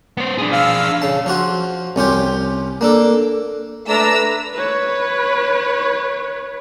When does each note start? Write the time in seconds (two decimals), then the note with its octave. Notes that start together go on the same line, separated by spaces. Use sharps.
0.17 B3 C5
0.38 D4 G#4
0.52 F5 E6 F6
1.02 C#3 A5
1.26 F3 F4 F#4
1.96 C2 C#4 F4 G4
2.81 A#3 D4 A4
3.88 A3 D4 B4 A#5 E6
4.54 B4 C#5